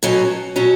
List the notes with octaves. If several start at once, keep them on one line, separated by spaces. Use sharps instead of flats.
B2 F#3 C#4
B2 F#3 C#4